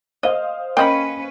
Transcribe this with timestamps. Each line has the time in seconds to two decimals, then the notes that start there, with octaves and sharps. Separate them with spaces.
0.23 C5 D#5 F5 D#6
0.77 A#3 C#4 B4 D#5 G5 B5